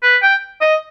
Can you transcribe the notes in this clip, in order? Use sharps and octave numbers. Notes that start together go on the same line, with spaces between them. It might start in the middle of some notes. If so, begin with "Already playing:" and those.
B4
G5
D#5